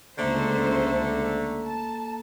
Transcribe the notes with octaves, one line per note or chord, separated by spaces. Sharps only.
C#2 D3 A3 A#3 A4 C5 A#5
A5